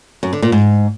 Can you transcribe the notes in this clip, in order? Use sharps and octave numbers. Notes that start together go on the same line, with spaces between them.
F#2
D3
A#2
G#2